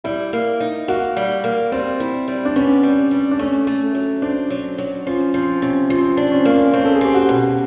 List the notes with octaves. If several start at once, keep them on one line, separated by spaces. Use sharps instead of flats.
G3 E4
A#3
D#4
A#3 F#4
G3
A#3
G3 C4
E4
G3
D4
B3 C#4
G3
G3
D4
A3 C#4
A3
F#3
C4 D4
F#3
F#3
F3 C#4
F3 C4
C3 C#4
F3 C4
D4
C#4
C4
A#3 C#4
C4 C#4
A4
G#4
C4 G4
F#4
B2